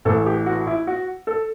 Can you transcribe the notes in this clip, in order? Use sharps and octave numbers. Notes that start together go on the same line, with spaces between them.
A1 A2 E3 A3 A4
G4
F#4
E4
F#4
A4